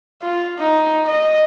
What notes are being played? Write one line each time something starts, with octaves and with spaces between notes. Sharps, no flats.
F4
D#4
D#5